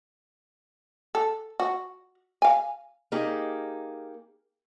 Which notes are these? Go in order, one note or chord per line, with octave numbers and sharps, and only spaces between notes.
A4
F#4
F5 G#5
A#3 D#4 G4 G#4